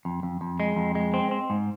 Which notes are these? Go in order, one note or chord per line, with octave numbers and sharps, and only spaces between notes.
F2
F2
F2
G#3
F2
G#3
C4
C4
G#2